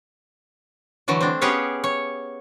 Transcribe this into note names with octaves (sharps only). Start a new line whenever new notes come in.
D3 E3 F#3 A3
C4 D4
B3 C#4 G4 G#4 C#5 F5
C#5